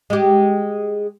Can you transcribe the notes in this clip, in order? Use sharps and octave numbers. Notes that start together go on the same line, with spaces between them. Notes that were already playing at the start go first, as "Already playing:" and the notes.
G#3 G4